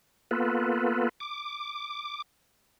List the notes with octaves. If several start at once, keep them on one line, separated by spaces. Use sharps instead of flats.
A#3 B3 F4 A4 B4
D6